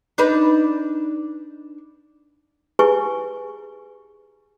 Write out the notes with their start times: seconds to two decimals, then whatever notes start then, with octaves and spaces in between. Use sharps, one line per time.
0.18 D4 D#4 B4
2.79 E4 G4 G#4 B4 G#5 C#6